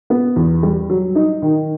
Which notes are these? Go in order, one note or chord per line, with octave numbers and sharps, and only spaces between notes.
B3
E2
G3
F#3
D#4
D#3